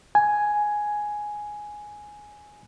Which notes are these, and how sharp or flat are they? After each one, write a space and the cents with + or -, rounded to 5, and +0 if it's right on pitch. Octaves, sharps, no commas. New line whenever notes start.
G#5 +5